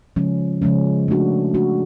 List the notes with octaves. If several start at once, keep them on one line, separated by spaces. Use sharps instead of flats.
C#3 F3 G#3 C#4
C#3 F3 G#3 C#4
A3 D4 F#4
A3 D4 F#4